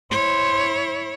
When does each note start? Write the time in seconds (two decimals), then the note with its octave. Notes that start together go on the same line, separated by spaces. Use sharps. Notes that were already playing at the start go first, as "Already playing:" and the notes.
0.12 E4 C5 C#5